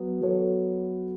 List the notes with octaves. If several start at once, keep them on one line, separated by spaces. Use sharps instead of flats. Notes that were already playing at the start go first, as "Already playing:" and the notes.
Already playing: F#3 B3 F#4
F#3 B3 F#4 A4 C#5